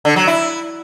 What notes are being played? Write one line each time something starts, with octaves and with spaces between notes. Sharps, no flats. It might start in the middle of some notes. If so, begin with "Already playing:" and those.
D3
F#3
E4